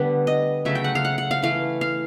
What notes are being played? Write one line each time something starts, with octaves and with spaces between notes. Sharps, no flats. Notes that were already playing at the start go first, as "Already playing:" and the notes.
Already playing: D3 G3 A3 B3 B4
D#5
C#3 F#3 A3 E5
G5
F#5
F5
F#5
F#5
F5
E3 A3 F5
F5